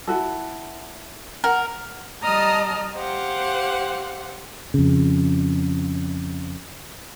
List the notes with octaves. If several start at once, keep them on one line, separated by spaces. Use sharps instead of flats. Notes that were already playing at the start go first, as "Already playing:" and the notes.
E4 F#4 A4
A#4 F#5
G3 D#5 A5 A#5 D#6 F6
G4 C5 F5 F#5
F2 C#3